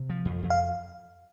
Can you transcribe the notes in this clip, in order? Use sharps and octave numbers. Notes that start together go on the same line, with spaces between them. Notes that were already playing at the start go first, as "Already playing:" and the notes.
Already playing: C3
F3
F2
F2
F5